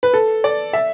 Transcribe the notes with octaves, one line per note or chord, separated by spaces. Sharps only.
B4
A4
D5
E5